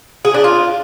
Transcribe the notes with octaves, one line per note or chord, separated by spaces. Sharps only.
G#4
D4
F4